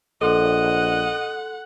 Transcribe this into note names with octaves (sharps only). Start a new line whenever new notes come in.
A#1 A4 D#5 F#5 C6